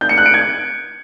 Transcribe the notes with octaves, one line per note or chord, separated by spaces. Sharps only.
G6
C#7
F#6
D7
G#6